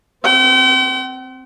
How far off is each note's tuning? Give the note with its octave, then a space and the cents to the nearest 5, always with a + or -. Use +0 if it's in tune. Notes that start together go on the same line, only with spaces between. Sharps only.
C4 +0 G5 -45